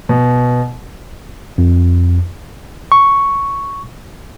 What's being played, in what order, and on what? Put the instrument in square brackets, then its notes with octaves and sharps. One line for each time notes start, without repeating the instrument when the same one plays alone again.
[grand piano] B2
[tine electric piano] F2
[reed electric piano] C#6